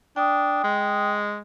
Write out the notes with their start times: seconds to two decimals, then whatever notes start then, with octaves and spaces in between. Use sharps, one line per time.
0.16 D4 G5 D#6
0.64 G#3